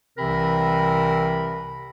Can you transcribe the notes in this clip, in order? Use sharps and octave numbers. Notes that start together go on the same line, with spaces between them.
C2 C3 E3 C4 A#4 B5